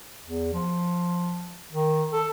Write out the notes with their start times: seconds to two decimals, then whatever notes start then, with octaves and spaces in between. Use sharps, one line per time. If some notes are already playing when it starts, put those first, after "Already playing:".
0.24 E2
0.53 F3
1.72 D#3
2.13 A4